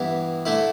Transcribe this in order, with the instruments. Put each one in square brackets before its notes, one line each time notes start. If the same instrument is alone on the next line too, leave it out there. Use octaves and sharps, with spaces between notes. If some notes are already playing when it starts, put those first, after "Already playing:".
Already playing: [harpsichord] G2 E3 B3 E4
D3 A3 E4